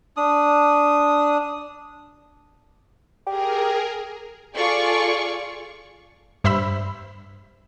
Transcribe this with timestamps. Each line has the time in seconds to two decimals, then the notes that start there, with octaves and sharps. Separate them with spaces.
0.17 D4 D#6
3.27 G4 G#4 A#4
4.55 F4 G#4 A4 D5 C#6
6.44 G2 C5 E5 B5 E6